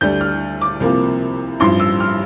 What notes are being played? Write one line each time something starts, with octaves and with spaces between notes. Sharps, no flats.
D2 D3 G3 G6
F6
D6
C2 C3 F3 A#3
A1 G2 F3 C6
E6
F6